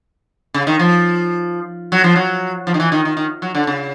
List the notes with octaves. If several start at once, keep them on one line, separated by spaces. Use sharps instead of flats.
C#3
D#3
F3
F#3
F3
F#3
F3
D#3
E3
D#3
D#3
D#3
F#3
D3
C#3